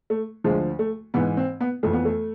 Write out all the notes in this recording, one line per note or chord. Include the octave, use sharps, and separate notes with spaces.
A3
D2 D3 F3 G#3
A3
G#2 E3 B3
C4
B3
F2 E3 A3
B3
A3